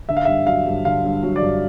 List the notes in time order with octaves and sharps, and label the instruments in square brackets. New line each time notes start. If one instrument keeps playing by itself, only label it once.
[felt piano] D3 [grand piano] E5
[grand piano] F5
[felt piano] G2 [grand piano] E5
[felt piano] F#3 [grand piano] F5
[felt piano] G2
[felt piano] D3 [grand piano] F5
[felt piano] G2
F#3
[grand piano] D5
[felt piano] G2